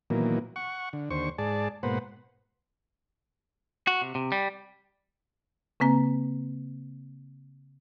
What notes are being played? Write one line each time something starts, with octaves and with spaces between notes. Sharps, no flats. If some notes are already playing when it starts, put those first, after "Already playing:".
A#2 D#3 E3 F#3 A#3 B3
F#5 C#6
D3
D#2 D3 C5 C#6
G#2 G#4 D5 A5
G#2 B2 A#3 B4 C5 F#5
F#4
C3
C3
G3
C#3 A#3 C4 A#5